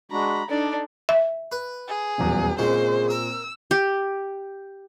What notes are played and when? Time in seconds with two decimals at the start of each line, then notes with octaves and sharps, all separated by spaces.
0.12 G#3 D4 F#4 A#5 B5
0.50 D4 D#4 A4 D5
1.09 E5
1.52 B4
1.88 G#4
2.18 D#1 B1 E2
2.59 A#2 C#3 G#3 C4 C5
3.10 A#4 E6
3.71 G4